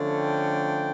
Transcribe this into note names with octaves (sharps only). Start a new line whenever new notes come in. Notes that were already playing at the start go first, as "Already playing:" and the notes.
Already playing: D3 F3 A3 C#4
G5